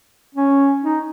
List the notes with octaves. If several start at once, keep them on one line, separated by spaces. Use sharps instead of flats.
C#4
D#4